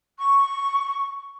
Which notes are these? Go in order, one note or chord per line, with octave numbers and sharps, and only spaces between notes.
C#6